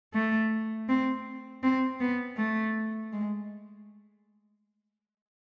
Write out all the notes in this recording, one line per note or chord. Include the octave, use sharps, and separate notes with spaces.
A3
C4
C4
B3
A3
G#3